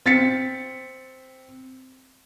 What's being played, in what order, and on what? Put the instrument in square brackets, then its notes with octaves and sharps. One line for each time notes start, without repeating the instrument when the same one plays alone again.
[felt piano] C4 A6 B6 C#7